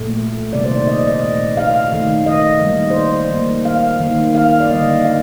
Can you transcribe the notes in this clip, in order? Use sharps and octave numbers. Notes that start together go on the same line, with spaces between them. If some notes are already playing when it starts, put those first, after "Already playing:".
Already playing: A#2 A3
C3 D#3 G3 A#3 D5
C5
D5
D#5
D5
D#5
A#2 A3
F5
D#3 A3
D#5
D#3 G3 A#3
C5
D5
D#3 G3 A#3
F5
D#3 A#3
F5
D5
D3 G3 A#3 D#5
F5